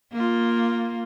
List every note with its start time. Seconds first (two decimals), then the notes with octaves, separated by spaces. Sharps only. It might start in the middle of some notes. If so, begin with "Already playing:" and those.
0.12 A#3 F4